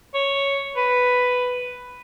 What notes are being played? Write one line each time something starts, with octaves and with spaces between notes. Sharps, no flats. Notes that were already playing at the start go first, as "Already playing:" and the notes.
C#5
B4